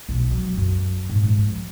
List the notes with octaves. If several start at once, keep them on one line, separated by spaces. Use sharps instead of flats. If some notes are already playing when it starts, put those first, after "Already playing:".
B1
F#3
F#2
G#2
G#2
F3